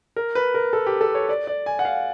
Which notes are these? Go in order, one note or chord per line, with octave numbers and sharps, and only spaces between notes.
A#4
B4
A#4
A4
G4
A4
C#5
D5
D5
G#5
F#5
F5